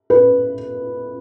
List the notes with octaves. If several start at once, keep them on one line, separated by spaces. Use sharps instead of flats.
B4